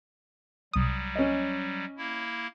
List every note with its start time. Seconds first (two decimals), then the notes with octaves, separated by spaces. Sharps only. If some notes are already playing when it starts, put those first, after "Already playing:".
0.73 C2 F#3 G3 D#6
1.15 C#4 D#5
1.97 A#3 E4